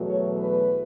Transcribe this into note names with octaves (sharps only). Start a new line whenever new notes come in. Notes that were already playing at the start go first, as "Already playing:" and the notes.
Already playing: E2 B2 F#3 A3
C#5
B4